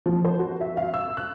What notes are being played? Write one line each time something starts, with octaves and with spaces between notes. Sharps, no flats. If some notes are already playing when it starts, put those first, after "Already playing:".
F3
C5
F#4
E5
F5
E6
F#6